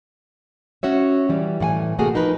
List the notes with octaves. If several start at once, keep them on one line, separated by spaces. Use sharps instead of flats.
C#4 F#4 C#5 E5
E3 G3
A2 E3 F#5 G#5
C3 A3 A#3 F#4 G#4
F3 D#4 A#4 B4